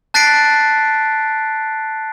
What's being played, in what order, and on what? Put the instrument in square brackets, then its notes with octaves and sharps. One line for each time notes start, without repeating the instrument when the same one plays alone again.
[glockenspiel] A5 F#6 A6 B6 C7 D7